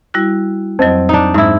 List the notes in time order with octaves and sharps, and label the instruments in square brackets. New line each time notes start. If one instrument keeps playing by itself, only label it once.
[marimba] G3 E4 F#4
[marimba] F2 F#3 [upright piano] C4 D#5
[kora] D4 D#4
G#2 E4